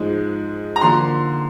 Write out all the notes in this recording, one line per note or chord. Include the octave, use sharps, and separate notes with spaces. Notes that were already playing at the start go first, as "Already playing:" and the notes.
Already playing: G#2 F3 G#3
A#5
D3 F3 A#3 C6